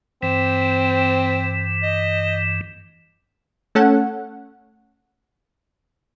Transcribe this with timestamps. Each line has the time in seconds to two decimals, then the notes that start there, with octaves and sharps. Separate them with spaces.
0.23 G2 E3 C4
1.83 D#5
3.75 A3 C#4 A4 F#5